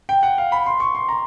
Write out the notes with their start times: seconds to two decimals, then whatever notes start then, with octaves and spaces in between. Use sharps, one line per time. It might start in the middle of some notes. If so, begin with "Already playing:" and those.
0.09 G5
0.23 F#5
0.38 F5
0.52 B5
0.66 C6
0.80 C#6
0.95 C6
1.09 A#5